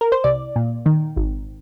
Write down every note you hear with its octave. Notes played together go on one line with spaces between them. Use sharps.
A#4
C5
C2 D5
A#2
D#3
G#1